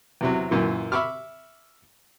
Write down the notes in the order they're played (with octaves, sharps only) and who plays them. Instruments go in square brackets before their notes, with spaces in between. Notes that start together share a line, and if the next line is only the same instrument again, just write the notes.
[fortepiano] E2 C3 F#3
F#2 A#2 E3
E5 B5 C#6 D6 F6